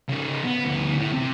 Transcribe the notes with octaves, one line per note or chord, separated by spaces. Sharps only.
C#3 D#4
B3
D2 B3
A2
C3